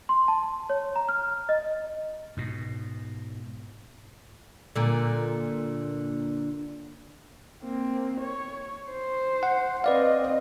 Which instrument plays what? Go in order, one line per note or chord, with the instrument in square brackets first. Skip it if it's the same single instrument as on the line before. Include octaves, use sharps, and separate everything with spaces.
[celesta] C6
A5
C#5
A#5
F6
D#5
[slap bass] G#2 B2
[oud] A#2 D3
[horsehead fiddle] A#3 C4
C#5
C5
[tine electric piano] F#5
[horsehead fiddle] C4 D#5 [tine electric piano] B4 D5 F5